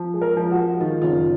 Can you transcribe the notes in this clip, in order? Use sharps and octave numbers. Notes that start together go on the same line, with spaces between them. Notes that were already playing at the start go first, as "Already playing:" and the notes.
Already playing: F3
G#3
A#4
F3
F#4
G#3
D#3 F4
F#1 F4